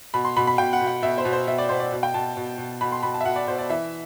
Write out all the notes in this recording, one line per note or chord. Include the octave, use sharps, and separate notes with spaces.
B2 B5
C6
B2 B5
B5
B2 G5
F#5
B2
F#5
B2 E5
C5
B2
C5
B2 E5
D5
B2 C5
D5
B2
G5
B2 A5
B2
B2
B2 B5
C6
B2 B5
A5
E5
B2 F#5
D5
B2 C5
D5
E3 E5